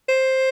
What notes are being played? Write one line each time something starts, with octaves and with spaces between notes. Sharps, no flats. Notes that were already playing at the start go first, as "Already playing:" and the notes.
C5